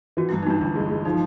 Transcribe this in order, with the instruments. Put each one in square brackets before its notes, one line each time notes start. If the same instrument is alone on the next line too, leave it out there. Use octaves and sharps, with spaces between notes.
[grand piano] E3 [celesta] F#4
[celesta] E4
[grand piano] G2
[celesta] D#4
[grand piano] G2 [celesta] D4
[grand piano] G1 [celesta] D4
[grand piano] G#3
G#3
[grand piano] F3 [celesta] D#4